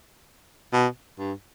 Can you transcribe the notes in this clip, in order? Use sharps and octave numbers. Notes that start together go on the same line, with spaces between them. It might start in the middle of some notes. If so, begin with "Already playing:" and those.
B2
G2